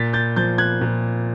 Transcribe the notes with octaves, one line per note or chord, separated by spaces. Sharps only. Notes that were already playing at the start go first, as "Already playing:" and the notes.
Already playing: A#2 A6 B6
G6 A6
F3 G6 A6
F#6 G#6
A#2